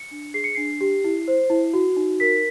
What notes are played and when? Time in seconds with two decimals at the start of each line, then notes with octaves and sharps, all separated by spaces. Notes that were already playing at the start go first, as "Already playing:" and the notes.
Already playing: C#7
0.11 D4
0.34 G#4 C7
0.44 C#7
0.55 D4 C7
0.81 G4
1.04 E4
1.28 C5
1.50 E4
1.74 F#4
1.96 D#4
2.20 A#4 B6